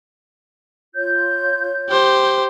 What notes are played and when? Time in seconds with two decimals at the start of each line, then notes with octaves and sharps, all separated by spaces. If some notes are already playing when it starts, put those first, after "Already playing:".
0.95 F4 C#5 G6
1.89 G4 C5